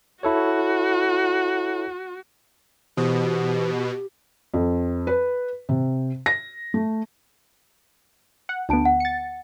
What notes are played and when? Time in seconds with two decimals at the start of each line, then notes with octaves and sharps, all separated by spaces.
0.23 E4 F#4 A4 C#5
2.97 B2 E3 G4 C5 D#6
4.54 F2
5.07 B4
5.69 C3
6.26 A#6
6.74 A3
8.49 F#5
8.69 D2 B3 D4 A5 D7
8.85 F#5
9.00 A6 C#7